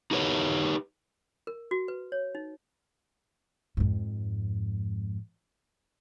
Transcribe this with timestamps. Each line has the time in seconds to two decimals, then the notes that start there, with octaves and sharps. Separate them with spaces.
0.11 D#4 G4 B4 C#5
1.47 A#4
1.71 F#4
1.88 B4
2.12 C#5
2.35 D#4
3.77 F2 G#2